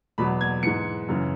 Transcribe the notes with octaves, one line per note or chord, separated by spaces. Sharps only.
E2 B2 F#3 B5
G#6
G#2 E3 C#7
F#2 C#3 E3